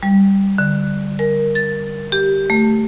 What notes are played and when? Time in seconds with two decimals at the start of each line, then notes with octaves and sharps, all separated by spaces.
0.03 G3
0.58 D3
1.19 A#4
1.55 A6
2.12 G4
2.50 A3